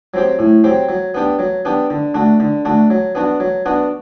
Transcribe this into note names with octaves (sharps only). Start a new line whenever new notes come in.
F#3 C4 G4
A2
F#3 C4 G4
F#3
B3 D4 G4
F#3
B3 D4 G4
D3
A3 D4 F#4
D3
A3 D4 F#4
F#3
B3 D4 F#4
F#3
B3 D4 F#4